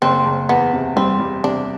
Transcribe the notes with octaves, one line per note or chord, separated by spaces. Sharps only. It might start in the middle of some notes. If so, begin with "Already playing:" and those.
F#1 C4
F#1
E2 B3
C3
G3 C4
G3
C3 D4